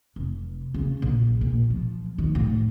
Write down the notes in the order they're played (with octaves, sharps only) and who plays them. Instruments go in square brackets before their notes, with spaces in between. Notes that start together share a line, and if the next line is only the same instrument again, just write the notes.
[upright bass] F1
C#3
A#1
A#2
F3
D#3
A2